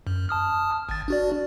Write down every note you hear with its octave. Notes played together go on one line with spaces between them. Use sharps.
F#2
A5 D#6 F6
G#1 A6
D4 F#4 D5